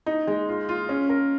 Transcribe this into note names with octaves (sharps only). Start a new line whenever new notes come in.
D#4
G#3
F4
F4
C#4
A#4